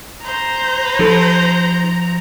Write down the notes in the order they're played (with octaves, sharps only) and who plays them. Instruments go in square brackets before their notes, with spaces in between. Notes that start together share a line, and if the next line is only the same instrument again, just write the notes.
[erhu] C5 [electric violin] A#5
[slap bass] F3 [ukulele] D#4 G4 A4